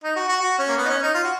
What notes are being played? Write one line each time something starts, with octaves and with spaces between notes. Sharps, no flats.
D#4
F#4
F#4
F#4
C#4
A#3
B3
D#4
C#4
D#4
F4
F#4